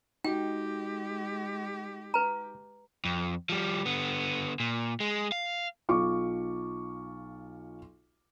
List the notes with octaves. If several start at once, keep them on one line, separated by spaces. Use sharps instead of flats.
G#3 D#4 F#4 G4 G5
B4 A#5
F2
F3 G3
D3 B3
A#2
G#3
F5
B1 F4 C#6 D6